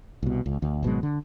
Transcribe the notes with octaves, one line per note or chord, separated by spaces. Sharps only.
C2 B2
C#2
D2
G#1 B2 F#3 G#3
D3